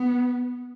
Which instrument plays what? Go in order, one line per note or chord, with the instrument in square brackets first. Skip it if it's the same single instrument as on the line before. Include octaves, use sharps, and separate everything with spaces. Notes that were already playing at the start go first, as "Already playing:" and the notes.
Already playing: [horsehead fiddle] B3